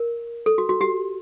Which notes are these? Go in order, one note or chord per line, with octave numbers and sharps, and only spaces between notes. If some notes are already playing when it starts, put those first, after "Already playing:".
Already playing: A#4
A4
F#4
F#4
G4